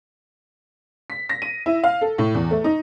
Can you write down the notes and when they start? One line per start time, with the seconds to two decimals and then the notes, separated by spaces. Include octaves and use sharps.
1.10 B6
1.29 A#6
1.42 D#7
1.66 E4
1.84 F5
2.01 A4
2.18 A2
2.34 E2
2.51 A3
2.64 D#4